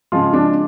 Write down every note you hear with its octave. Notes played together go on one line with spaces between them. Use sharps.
C#3 F3 G#3 F4
D4